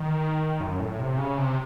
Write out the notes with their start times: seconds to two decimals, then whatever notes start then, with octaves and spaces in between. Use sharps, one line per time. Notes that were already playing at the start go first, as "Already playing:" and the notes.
Already playing: D#3
0.60 F#2
0.80 A2
0.99 C3
1.18 C#3
1.38 C3